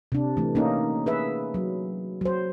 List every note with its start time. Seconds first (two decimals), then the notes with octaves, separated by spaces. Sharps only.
0.12 C3 D4
0.37 E3 A3
0.55 A#3 C#4 D#4
1.06 G#4 B4 E5
1.54 F#3
2.21 F#3 C5